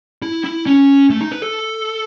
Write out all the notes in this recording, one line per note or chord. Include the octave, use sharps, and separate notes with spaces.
E4
E4
C#4
A3
D#4
B4
A4